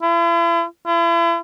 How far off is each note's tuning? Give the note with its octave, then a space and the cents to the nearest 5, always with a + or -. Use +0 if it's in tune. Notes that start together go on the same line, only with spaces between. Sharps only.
E4 +45
E4 +40